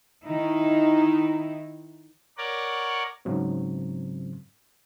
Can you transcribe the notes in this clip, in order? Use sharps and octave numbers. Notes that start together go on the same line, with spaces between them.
D#3 D#4 E4
A#4 C#5 D5 F#5
G#2 C#3 F#3 C4